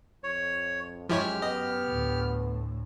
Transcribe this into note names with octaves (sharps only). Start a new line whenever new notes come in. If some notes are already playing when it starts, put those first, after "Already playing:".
F2 C#5
F#2 F3 G#3 E4 G4 C#5 F6
B3 D#5
D2 A2